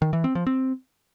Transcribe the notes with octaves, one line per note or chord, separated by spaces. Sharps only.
D#3
E3
C4
F3
C4